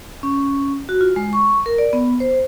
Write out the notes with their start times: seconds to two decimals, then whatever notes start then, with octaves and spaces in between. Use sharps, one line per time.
0.23 C#4
0.89 F#4
1.01 F4
1.16 G#3
1.33 C#6
1.66 A#4
1.78 D5
1.93 B3
2.20 C5